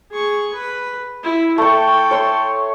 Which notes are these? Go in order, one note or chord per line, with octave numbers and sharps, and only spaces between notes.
G#4 C#6
B4
E4
A3 A4 G5 C#6
C#5 C6